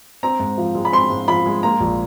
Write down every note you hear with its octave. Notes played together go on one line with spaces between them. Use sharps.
C4 A#5
G#2
F3
G#3
B5
C4 C6
G#2
F3 B5
G#3
A#3 A#5
A#1